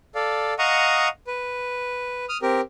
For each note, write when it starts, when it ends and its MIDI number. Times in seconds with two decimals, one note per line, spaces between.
0.15 0.54 69
0.15 0.54 74
0.15 0.54 77
0.59 1.08 75
0.59 1.08 77
0.59 1.08 78
0.59 1.08 82
0.59 1.08 85
0.59 1.08 87
1.27 2.25 71
2.29 2.37 87
2.29 2.37 89
2.42 2.61 60
2.42 2.61 67
2.42 2.61 70